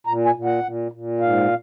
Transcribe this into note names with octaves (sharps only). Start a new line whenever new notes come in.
A#2 A#5
G#5
A#2
F#5
A#2
A#2
G#2 F5